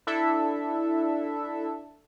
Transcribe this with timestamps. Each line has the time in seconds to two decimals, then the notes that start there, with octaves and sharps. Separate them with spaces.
0.07 D4 E4 A4 E5